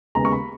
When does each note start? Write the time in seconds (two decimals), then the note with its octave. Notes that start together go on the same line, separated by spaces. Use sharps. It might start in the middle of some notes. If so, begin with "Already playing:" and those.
0.15 D#2 C#3 G#3 B3 A#5
0.25 C#6
0.32 B5